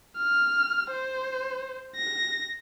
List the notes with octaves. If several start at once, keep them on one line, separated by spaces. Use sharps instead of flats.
F6
C5
A#6